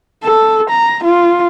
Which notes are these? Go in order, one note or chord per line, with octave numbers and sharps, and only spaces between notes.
A4
A#5
F4